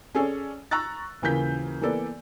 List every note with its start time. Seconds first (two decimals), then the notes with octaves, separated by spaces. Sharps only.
0.15 C#4 G#4 A4 C#5 D5
0.71 A#5 C#6 E6 F#6 A6
1.22 D#1 C#3 E3 A#3 G6 B6
1.81 E3 A#3 B3 A4 D5